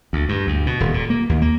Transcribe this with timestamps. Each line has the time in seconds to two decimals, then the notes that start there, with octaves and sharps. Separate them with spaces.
0.13 D2
0.29 G2
0.47 D2
0.66 B2
0.80 D#1
0.94 A#2
1.10 A#3
1.29 D#2
1.42 A#3